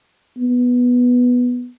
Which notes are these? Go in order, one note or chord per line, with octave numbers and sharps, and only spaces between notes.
B3